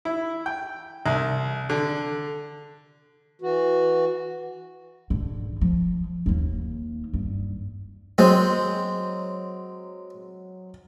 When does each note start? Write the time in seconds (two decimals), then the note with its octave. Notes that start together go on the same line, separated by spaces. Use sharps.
0.05 E4
0.46 G5
1.06 C2
1.70 D3
3.42 E3 F#4
5.10 G#2 D3
5.61 F3
6.26 D#2 A#3
7.14 G2
8.18 F#3 G#3 C4